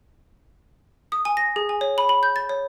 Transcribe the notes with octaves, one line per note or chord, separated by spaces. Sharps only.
D#6
G#5
A#6
G#4
G#5
C#5
B5
B5
G6
A6
C#5